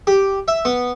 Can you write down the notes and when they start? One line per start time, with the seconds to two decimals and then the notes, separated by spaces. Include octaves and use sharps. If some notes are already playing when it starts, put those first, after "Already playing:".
0.07 G4
0.48 E5
0.65 B3